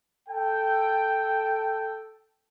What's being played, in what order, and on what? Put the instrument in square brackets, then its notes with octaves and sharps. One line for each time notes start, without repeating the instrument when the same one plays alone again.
[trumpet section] A4 G5